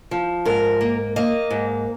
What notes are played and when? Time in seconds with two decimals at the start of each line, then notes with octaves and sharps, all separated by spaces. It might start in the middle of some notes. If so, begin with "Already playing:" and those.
0.11 F3
0.45 G#2 A#4
0.81 A#3
1.16 A#3 D#5
1.50 G#2